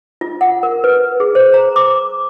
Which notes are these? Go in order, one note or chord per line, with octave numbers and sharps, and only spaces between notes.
F4
F#5
A#4
B4
G#4
C5
A#5
D6